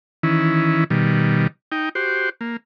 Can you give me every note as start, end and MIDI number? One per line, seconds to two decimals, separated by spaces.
0.23 0.84 51
0.23 0.84 52
0.23 0.84 61
0.23 0.84 64
0.90 1.47 47
0.90 1.47 51
0.90 1.47 55
1.72 1.89 63
1.72 1.89 79
1.95 2.29 66
1.95 2.29 67
1.95 2.29 72
2.41 2.57 58